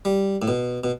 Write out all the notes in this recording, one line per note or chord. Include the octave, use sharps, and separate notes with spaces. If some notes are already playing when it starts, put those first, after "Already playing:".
G3
A2
B2
B2